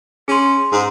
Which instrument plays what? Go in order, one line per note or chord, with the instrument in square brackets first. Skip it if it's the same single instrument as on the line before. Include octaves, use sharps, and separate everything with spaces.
[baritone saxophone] C#4 [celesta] G#4 C6
[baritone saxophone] G#2